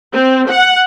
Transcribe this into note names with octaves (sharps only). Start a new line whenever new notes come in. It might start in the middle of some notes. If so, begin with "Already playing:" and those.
C4
F#5